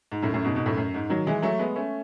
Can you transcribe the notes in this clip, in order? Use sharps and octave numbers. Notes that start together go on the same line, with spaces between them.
G#2
F#2 A2
F#2 A2
G#2 B2
G#2 B2
F#2 A2
F#2
G#2
D#3 F#3
E3 G#3
F#3 A3
G#3 B3
A3 C#4